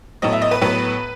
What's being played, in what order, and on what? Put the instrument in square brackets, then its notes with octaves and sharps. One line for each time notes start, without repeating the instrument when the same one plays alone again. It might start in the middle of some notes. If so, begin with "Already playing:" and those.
[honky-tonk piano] A2 F#3 B3 D#5
E5
D#5
B4
A2 F#3 B3 B4